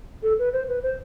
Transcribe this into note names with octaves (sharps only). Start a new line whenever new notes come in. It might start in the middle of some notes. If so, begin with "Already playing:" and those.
A4
B4
C5
B4
C5